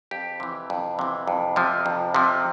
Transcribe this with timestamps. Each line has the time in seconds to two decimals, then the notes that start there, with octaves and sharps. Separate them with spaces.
0.11 F2 G4
0.40 C3 E3
0.70 F2
0.99 C3 E3
1.28 F2
1.56 C3 F3
1.86 F2
2.14 C3 F3